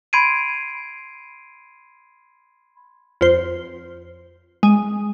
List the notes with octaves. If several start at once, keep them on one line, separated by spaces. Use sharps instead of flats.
B5 C6 G#6 C7 D7 D#7
F2 C5
G#3